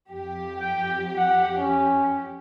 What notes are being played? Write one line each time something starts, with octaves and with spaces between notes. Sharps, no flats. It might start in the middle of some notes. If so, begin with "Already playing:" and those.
F2 G4
G5
F#5
C#4